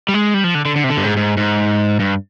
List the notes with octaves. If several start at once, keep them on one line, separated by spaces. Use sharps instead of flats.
G3
G#3
G3
F3
D3
D3
D3
C3
D3
G2
G#2
G#2
G#2
G2